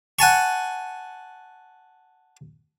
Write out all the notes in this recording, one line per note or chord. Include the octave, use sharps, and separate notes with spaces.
F#5 G#5 A5 C#6